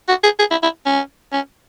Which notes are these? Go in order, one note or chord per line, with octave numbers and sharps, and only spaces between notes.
F#4
G#4
G#4
E4
E4
C#4
C#4